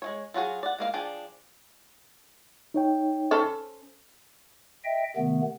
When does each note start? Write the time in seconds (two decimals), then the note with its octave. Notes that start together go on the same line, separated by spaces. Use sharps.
0.02 G#3 A3 C#5
0.34 F#3 F4 F#4 G#4
0.63 D5 F#5
0.78 G#3 A#3 F5
0.94 F3 D4 G#4 G5
2.74 D#4 C#5 G5
3.31 C#4 A4 C5
4.85 D#5 E5 G5
5.16 C3 D#3 A3 B3